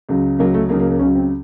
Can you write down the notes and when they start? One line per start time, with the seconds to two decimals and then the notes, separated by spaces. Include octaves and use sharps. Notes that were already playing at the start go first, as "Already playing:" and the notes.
0.09 C#2 C#3 F#3
0.39 C#2 C#3 F#3 A#3
0.54 A3
0.69 C#2 C#3 F#3 A#3
0.80 A#3
0.90 A#3
0.99 C#2 C#3 F#3 C#4
1.15 C4